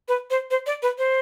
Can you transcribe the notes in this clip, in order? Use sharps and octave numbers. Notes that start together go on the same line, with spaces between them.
B4
C5
C5
D5
B4
C5